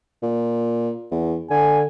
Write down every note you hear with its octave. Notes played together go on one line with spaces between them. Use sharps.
A#2
E2
D3 G#5